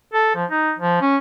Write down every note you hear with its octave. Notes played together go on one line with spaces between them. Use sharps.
A4
F3
D#4
F3
C#4